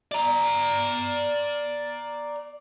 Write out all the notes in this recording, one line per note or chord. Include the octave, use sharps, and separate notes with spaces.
D5 A#5